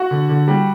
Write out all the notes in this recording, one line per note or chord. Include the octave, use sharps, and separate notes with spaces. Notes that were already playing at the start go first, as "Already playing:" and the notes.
Already playing: F#4 F#5
D3
D3
G3